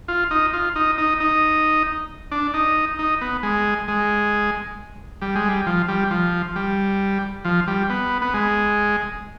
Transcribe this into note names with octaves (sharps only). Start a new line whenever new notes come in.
F4
D#4
F4
D#4
D#4
D#4
D4
D#4
D#4
B3
G#3
G#3
G3
G#3
G3
F3
G3
F3
G3
F3
G3
B3
B3
G#3